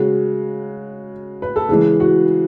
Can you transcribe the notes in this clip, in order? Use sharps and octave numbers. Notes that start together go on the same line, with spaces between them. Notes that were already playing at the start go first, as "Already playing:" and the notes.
Already playing: C#3 G#3 F#4
B4
A4
C#3 E3 G#3 G#4
F#4